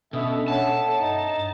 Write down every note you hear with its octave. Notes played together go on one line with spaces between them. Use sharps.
B2 C#4 D4 A4 E5
A4 C#5 F#5 A5
G2 D#4